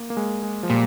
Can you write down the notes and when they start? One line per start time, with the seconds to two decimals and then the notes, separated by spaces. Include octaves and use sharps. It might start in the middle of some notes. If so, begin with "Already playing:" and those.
Already playing: A#3
0.10 A#3
0.17 G#3
0.43 G#3
0.63 F3
0.69 A#2 G3